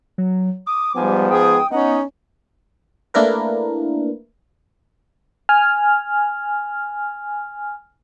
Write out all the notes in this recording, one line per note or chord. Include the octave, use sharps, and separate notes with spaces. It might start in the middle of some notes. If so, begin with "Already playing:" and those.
F#3
D6 D#6
G#2 F3 G3 B3 G#5
G#4 G5 D#6
B3 C#4 D#4 F#5
A3 A#3 D4 E4 A#4 B4
G#5 F6